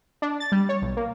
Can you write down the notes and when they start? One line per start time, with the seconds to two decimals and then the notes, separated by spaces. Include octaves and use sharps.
0.22 D4
0.40 A6
0.52 G3
0.69 C#5
0.82 B1
0.97 A#3